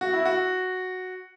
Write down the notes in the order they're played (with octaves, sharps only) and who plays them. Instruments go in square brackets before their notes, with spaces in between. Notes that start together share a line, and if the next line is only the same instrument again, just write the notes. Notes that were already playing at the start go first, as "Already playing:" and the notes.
[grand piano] F#4
E4
F#4